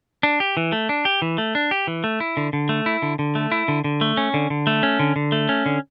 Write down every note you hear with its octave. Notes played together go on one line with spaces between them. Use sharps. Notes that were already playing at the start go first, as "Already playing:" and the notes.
D4
G4
E3
A3
D4
G4
E3
A3
D4
G4
E3
A3
E4
D3
D3
A3
E4
D3
D3
A3
E4
D3
D3
A3
C#4
D3
D3
A3
C#4
D3
D3
A3
C#4
D3